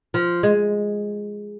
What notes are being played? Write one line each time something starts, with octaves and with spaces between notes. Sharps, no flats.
F3
G#3